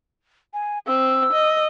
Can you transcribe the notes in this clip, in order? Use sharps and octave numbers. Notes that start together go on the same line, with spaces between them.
G#5
C4 E6
D#5